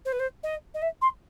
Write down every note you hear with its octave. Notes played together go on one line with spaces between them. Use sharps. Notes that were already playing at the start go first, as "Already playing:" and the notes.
C5
B4
C5
D#5
D#5
E5
C6